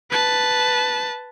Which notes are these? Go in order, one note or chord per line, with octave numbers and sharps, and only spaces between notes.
B4 A5